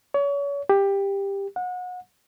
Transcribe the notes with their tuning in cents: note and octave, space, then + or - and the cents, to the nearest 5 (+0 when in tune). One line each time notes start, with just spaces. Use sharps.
C#5 +35
G4 +15
F#5 -30